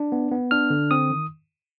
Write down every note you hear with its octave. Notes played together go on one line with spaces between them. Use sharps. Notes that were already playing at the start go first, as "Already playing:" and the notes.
Already playing: D4
B3
B3
D4 F6
D3
C4 D#6
D#3